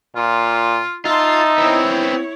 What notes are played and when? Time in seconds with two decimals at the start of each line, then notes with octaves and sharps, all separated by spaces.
0.16 A#2 F4
1.05 D#4 F4 E5 A5 C6
1.58 B3 C4 E4 C#5